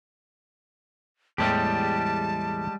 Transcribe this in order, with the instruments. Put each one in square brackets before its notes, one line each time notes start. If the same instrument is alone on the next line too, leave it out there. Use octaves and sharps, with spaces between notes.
[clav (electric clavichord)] E2 A2 E3 [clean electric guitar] G3 G#3 G4 [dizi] A5